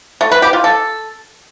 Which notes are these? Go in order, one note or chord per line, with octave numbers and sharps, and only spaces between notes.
A3
B4
G4
F4
A4